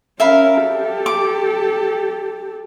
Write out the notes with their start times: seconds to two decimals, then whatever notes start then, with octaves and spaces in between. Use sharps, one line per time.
0.20 C#4 A#4 E5 F5 B5
0.64 G4 A4
1.06 D6